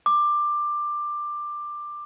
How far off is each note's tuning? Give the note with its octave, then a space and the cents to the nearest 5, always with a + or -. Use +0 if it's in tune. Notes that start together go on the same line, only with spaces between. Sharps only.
D6 +15